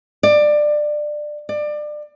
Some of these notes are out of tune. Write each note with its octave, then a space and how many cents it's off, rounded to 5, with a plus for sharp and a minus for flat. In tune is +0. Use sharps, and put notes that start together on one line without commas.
D5 +20
D5 +25